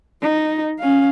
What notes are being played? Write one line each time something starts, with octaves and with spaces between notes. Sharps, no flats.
D#4
C#4 F5